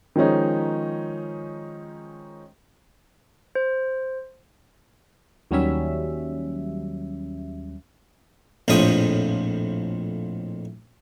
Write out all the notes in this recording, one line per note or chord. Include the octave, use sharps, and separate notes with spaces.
D#3 F3 G#3 C#4 D#4
C5
D#2 F#3 G3 C#4 E5
A#1 F2 A2 F3 C#5 D#6